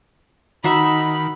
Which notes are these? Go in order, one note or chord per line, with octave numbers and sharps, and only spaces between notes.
D#3 D#4 F#4 E5 B5